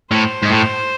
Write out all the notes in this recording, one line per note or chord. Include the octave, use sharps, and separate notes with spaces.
A2 C5
G#2
A2